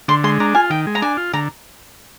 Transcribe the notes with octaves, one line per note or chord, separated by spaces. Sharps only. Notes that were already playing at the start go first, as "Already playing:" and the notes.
D3 C6
G#3 C6
D4 A#5
F4 G#5
D#3 G5
G#3
A#5
D4 G#5
F4
D3 A#5